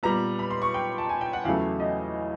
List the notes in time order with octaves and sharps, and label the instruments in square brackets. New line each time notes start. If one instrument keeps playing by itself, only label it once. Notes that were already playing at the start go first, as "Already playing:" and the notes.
[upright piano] A#2 G3 B3 A#5
B5
C6
C#6
G5
A5
G#5
G5
F#5
E2 C#3 F#3 A3 F5
D#5